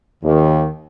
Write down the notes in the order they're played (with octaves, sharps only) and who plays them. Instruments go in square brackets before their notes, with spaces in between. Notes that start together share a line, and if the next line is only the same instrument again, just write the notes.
[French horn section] D#2 [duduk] D#3